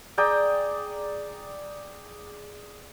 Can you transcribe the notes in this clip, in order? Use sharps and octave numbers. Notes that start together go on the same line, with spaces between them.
G#4 D5 G5 A#5